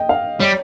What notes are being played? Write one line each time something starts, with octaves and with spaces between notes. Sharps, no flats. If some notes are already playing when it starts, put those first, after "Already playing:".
Already playing: D#5 G5
F5
G3 C#5